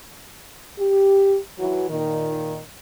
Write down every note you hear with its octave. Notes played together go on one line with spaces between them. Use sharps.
G4
E3 F#3
A#2 D#3